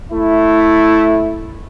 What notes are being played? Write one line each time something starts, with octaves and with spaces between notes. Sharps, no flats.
A3 E4